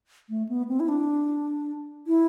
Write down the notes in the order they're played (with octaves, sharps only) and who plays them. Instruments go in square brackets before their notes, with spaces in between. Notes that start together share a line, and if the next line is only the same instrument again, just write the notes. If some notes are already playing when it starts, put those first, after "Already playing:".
[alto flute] A3
B3
C4
E4
D4
E4